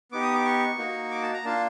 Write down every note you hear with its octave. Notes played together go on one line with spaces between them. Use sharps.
B3 D#4 G4 D6
D#6
D6
C#6
A#3 D#4 F#4
D6
A5
A#5
A#3 D4 F4 A5